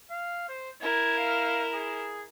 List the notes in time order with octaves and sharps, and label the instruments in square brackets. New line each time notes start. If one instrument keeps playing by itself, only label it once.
[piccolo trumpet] F5
C5
[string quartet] E4 A#4 [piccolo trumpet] G#6
[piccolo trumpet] F5
G#4